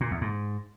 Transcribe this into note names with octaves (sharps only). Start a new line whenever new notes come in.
A#2
E2
G#2